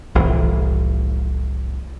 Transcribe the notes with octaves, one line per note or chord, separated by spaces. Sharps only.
F1 C2 A2 E3